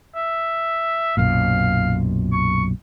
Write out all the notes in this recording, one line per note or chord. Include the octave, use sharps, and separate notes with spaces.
E5
B1 F#2 A#2 F5
C#6